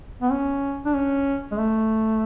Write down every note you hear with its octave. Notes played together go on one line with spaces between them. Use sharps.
B3
C#4
D4
C#4
G#3
A3